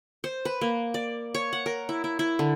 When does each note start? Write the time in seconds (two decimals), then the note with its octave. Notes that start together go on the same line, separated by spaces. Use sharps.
0.24 C5
0.45 B4
0.61 A#3
0.94 D5
1.34 C#5
1.53 F#5
1.66 A#4
1.89 E4
2.04 E4
2.19 E4
2.39 D3